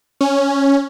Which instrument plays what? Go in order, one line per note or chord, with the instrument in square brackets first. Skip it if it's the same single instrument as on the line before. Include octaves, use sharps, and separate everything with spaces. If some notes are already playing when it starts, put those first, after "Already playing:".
[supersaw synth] C#4